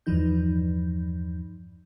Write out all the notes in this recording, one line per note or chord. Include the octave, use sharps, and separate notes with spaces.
E2 G2 E3 F3 D#4 G6